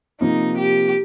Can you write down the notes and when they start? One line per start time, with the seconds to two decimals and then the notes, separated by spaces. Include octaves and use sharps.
0.21 C3 F3 A#3 D#4
0.58 G4